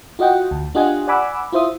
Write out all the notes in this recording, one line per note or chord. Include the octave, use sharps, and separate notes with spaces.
F4 F#4 D#5 F#5 G5
D2
D4 F4 G4 D#5 F#5 G#5
D5 F#5 G#5 B5 D6 E6
E4 F4 C5 E5 D#6